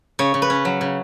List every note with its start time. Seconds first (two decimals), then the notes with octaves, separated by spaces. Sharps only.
0.19 C#3 C#5
0.34 C#3
0.42 B4
0.50 C#4
0.65 F#3
0.81 C#3